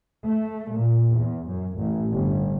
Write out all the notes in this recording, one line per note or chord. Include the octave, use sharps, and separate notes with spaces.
A3
A#2
E2
F#2
A1
G1